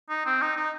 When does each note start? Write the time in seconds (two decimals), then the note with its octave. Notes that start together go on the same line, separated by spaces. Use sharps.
0.10 D#4
0.26 C4
0.41 D#4
0.57 D#4